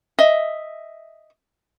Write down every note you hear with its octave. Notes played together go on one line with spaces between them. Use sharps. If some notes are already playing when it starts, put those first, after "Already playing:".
D#5 E5